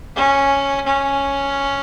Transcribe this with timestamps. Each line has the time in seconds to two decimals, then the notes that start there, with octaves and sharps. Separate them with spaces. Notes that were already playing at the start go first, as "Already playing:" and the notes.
0.16 C#4
0.87 C#4